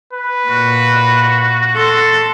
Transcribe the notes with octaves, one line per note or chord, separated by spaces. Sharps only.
B4
A#2 F#4
A4 C6